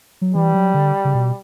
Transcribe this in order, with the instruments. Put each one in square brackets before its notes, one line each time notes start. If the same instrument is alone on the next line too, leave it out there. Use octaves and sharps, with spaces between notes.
[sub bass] F#3
[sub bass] E3 [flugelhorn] G3
[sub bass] F#3
D3
C#3
B2